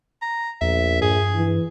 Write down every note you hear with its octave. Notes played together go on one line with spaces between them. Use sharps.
A#5
A#1 E2 E5
G2 G#4
E3